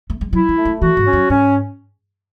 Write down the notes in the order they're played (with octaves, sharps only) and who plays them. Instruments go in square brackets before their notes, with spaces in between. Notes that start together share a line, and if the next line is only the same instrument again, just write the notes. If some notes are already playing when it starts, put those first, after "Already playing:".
[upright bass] A3
G#3
[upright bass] F#3 [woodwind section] E4
[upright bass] G#3
[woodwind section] A3
[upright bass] G#3
[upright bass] E3 [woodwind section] F#4
[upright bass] G#2
[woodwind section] C#4
[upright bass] F#2
[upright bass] G#2 [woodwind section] C#4